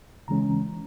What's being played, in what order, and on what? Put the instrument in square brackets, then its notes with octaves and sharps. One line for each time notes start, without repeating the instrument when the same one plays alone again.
[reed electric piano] D2 C#3 E3 G#3 C#4 A#5